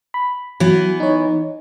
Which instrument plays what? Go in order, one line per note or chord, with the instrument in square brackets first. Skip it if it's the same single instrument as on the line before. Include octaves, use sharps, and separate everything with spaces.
[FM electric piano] B5
[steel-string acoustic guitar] E3 B3 [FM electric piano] F#3
[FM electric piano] D#4 C#5